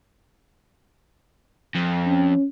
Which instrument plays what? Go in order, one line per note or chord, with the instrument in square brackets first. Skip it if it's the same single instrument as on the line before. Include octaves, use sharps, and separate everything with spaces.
[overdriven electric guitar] F2
[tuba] C#4